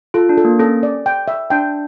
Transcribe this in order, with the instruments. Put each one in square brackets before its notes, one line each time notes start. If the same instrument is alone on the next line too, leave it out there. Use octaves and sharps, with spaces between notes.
[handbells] F4 [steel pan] A4
[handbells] D4
[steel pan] A4
[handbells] A#3
[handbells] C#4 [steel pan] A4
[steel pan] D5
G5
E5
[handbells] D4 [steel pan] G5